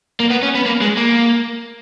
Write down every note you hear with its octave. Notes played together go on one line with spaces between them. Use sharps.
A#3
B3
C#4
B3
A#3
G#3
A#3